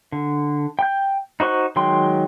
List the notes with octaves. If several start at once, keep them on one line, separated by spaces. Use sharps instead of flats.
D3
G5 G6
D#4 F#4 C5 C#6 F#6
D#3 F#3 G#3 G5 C6